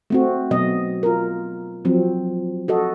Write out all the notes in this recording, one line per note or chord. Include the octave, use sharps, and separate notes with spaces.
A3 C4 F#4
B2 F#3 D#5
F4 A#4
F3 F#3 C4
F#4 A4 D#5